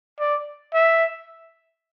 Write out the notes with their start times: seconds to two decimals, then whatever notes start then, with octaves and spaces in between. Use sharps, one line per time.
0.20 D5
0.74 E5